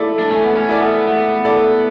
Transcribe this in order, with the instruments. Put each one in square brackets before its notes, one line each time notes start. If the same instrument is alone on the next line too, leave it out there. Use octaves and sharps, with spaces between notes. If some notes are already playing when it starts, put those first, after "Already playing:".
Already playing: [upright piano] A3 E4 A4 D5
[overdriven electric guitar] D4
[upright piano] A3 [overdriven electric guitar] C#4
[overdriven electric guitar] B3
C#4
[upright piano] E4 A4 D5
[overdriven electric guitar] B3
[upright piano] A3 [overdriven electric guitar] B3
[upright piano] E4 A4 D5